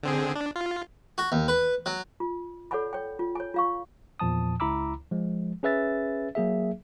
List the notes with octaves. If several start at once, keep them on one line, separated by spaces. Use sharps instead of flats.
D3 C4 G#4
D4
F4
F#4
D#2
B4
F#3
F4
A4 C#5 D5 F#5 G#5 B5
C#5 G5
F4
C#5 G#5
F4 F5 C#6
E2 A#2 F3 A5 D#6
C#2 E4 A#5 B5 D6 E6
F3 G#3
C#4 G#4 B4 E5 E6 A6
F#3 A#3 G#4 E5